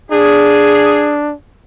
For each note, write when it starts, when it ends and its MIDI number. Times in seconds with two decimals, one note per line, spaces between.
0.12 1.33 62
0.12 1.15 68